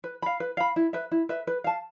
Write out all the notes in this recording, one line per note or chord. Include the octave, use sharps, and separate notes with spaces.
B4
F5 B5
B4
F5 B5
E4
B4 E5
E4
B4 E5
B4
F5 A5